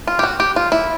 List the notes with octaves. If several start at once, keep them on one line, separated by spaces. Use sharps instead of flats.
F4
G4
F#4
G4
F4
E4